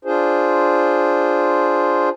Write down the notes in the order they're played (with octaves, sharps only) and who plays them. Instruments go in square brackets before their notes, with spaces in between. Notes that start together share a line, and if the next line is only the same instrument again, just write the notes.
[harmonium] D4 F4 G#4 C5